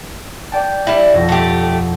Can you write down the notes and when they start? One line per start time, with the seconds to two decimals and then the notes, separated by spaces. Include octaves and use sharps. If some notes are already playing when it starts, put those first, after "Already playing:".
0.52 D5 G5 A5
0.87 G3 E4
1.13 B1 F2 A#6
1.29 A3 G4